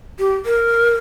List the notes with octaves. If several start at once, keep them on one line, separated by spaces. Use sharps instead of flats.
G4
A#4